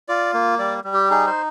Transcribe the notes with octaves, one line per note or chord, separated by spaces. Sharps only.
F4 D5
A#3
G3 D5
G3
G4
D#4 G#4
C5